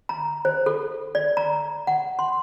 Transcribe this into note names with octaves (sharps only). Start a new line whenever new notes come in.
A#5
C5
A4
D5
A#5
F#5
C6